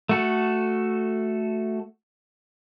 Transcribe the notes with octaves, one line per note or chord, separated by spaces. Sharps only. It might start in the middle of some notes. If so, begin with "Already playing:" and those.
A3 F#4 A4